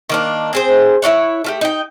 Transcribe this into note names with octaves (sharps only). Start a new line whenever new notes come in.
D#3 A#3 D4
C4 G#4 C5
E4 F4 C#5 F#5
A3 F4 G4
D#4 G5